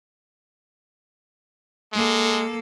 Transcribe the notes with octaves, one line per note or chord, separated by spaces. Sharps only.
G#3 A#3 A4